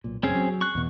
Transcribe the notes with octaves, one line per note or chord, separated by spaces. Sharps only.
B1 A#2
F#1 F#2 C4 C#4 G#4
F#3
C#6 F#6
E2 B2